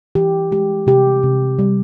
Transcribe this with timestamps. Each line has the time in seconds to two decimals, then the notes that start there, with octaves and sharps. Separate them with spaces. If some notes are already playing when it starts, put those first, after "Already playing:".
0.15 E3 G4
0.52 G#3 G4
0.87 C3 G4
1.23 C3
1.59 G3